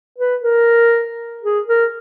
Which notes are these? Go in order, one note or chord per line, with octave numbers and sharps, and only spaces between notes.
B4
A#4
G#4
A#4